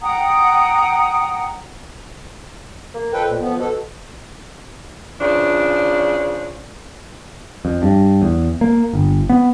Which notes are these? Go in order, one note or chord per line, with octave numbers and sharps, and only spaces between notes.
F#5 G5 A#5 D#6
A#3
F2 A4 B4 G5
A#2
F3 B3
B2 A4
C#3 E3 F3 D4
F2
G2
E2
A#3
G1
B3